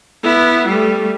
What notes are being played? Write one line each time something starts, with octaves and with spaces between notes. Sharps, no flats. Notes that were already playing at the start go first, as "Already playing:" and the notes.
B3 E4
G3 A3